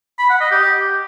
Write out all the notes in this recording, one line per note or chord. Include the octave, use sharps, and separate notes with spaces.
B5
F#5
D#5
G4